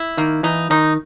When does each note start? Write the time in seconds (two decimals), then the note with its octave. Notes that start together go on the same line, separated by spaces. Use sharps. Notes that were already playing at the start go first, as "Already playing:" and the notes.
Already playing: E4
0.17 D#3 A#3
0.43 E3 D#4
0.70 D#3 D#4